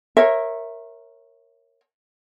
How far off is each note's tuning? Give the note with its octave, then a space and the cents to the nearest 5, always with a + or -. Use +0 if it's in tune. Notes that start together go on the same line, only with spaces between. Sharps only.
A#4 +0 C#5 -25 E5 +0